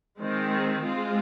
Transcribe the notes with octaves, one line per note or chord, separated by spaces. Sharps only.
D#3 G#3 C4
G#3 C4 F4